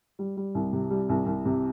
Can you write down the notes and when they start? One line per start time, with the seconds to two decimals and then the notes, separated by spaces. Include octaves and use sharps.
0.19 G3
0.37 G3
0.55 C2
0.73 C3
0.90 G3
1.09 C2
1.26 C2
1.45 C3